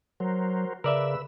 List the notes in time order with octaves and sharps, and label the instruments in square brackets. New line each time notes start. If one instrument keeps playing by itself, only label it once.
[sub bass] F#3 [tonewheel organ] F#4 A#4 C5
[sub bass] C#3 [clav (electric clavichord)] A#4 D5 E5 [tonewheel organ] B4 E6